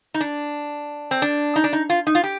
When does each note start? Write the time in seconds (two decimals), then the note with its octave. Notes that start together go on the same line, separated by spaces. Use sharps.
0.14 D#4
0.20 D4
1.11 C4
1.22 D4
1.56 D#4
1.64 D4
1.73 D#4
1.90 F4
2.07 D#4
2.15 F4
2.23 G4